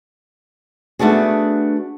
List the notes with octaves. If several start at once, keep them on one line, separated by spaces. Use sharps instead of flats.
A3 B3 D4 F#4 G#4